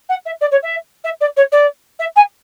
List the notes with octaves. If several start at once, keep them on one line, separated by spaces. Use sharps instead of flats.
F#5
E5
D5
C#5
E5
E5
D5
C#5
D5
E5
G#5